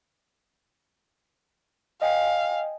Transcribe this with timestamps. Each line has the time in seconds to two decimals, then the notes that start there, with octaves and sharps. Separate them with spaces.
2.02 D#5 F5 G5 G#5